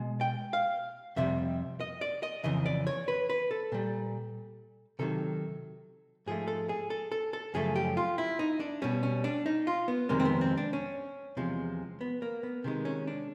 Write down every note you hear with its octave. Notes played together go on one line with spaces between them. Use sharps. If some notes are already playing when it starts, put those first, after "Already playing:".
Already playing: B2 G#3
G5
F5
F2 C3 G3 E5
D#5
D5
D#5
F2 C#3 E3 D#5
D5
C#5
B4
B4
A4
A#2 G3
C3 D#3 F#3 A4
G#2 F3 A3 G#4
A4
G#4
A4
A4
A4
F#2 C#3 F3 A3 G#4
G4
F4
E4
D#4
D4
B2 G3 C#4
C#4
D4
D#4
F4
B3
F2 C3 D#3 G#3 A#3
C4
B3
C4
D4
C#4
E2 C3 F3 G#3
B3
A#3
B3
C3 D#3 G#3
C#4
D4